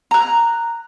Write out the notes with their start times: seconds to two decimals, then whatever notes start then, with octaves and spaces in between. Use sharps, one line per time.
0.11 A#5 F#6